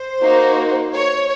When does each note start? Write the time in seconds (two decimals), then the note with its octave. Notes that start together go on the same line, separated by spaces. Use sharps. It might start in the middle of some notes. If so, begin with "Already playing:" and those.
Already playing: C5
0.21 A#3 D#4 F#4
0.93 C#5